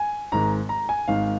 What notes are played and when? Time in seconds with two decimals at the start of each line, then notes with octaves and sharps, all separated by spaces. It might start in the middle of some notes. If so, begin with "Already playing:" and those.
Already playing: G#5
0.32 G#1 G#2 D#3 A#5
0.69 A#5
0.89 G#5
1.08 G#1 G#2 D#3 F5